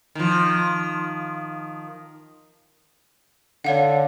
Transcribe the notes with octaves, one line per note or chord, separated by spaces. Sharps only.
D#3 F3
D3 C#5 F5 F#5